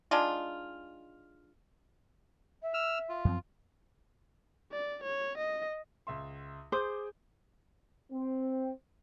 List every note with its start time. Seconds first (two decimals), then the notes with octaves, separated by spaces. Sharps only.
0.11 G#3 D4 D#4 F4
2.62 E5
2.74 E6 F6
3.09 F4
3.25 F#2 F3 C4
4.72 D5
5.03 C#5
5.37 D#5
6.07 C#2 E5 C6
6.72 G#4 C5 D6 D#6 G6
8.11 C4